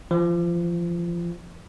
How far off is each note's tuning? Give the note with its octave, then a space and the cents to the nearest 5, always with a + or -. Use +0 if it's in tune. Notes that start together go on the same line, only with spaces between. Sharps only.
F3 -25